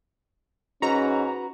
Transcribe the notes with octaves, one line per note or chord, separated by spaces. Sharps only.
G#2 C#4 F#4 B4 A#5